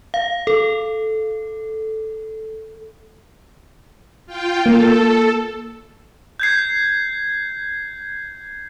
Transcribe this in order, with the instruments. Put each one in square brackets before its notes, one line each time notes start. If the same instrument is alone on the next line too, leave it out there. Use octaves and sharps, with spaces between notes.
[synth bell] F5
A4
[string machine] F4 G5
[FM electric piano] A#3 [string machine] A4
[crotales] G6 G#6 C7